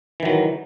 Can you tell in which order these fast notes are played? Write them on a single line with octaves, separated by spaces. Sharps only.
E3 D#3 F#3